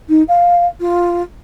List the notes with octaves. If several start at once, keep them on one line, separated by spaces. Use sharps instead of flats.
D#4
F5
F4